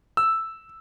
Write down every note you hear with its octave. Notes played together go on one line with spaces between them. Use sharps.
E6